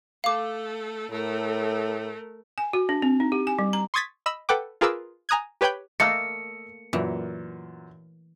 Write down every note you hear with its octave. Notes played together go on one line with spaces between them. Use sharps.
A3 A4 F5 D6
A2 A3 A#4
G#5
F#4
D4
C4
D#4
G4
G#5
G3
A#5
C6 C#6 D#6 G#6 A6 B6
D#5 B5 E6
A4 B4 F#5 G5 D6
F4 G#4 A#4 B4 D6 E6
G#5 A#5 D#6 F#6 G#6
G4 B4 C#5 G5 B5 G6
A3 A#3 D#5 F5 E6 C#7
F#2 A#2 E3